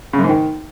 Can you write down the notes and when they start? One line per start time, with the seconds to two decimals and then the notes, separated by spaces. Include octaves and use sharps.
0.13 C#3
0.19 F#2
0.24 G#2
0.29 D#3